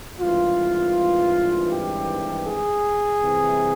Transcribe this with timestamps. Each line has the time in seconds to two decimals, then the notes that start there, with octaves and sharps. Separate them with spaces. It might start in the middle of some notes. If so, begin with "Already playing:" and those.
0.20 G#1 G2 E3 F4
1.70 G4
2.45 G#4
3.20 C2 C3 E3